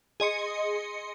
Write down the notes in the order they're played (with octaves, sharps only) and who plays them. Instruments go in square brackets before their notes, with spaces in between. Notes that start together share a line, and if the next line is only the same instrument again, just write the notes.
[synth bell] G#4 D#5 C6 C#7